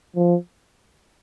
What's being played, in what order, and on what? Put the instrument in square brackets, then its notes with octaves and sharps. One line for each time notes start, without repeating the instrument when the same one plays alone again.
[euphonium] F3